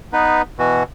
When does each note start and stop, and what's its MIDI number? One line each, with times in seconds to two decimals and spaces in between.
0.13 0.42 59
0.13 0.42 63
0.13 0.42 71
0.59 0.83 47
0.59 0.83 52
0.59 0.83 66